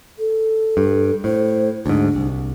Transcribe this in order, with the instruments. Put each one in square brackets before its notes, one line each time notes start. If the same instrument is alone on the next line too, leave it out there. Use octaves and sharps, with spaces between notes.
[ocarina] A4
[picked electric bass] G2
[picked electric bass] A2 [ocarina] C5
[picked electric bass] D2 G#2 [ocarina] D4
[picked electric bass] C2